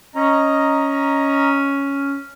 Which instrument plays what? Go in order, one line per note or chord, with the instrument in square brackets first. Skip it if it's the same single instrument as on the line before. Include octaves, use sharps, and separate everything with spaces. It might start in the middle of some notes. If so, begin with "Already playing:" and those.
[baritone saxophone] C#4 [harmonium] D#5 A#5